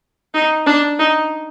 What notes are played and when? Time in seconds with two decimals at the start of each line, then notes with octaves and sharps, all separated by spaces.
0.34 D#4
0.66 D4
0.99 D#4